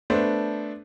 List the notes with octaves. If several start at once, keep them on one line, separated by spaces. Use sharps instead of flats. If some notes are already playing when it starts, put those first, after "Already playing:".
A3 B3 D4 C5